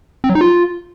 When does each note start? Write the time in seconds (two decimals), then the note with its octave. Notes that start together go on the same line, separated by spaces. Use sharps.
0.24 C4
0.30 F#3
0.35 D#4
0.41 F4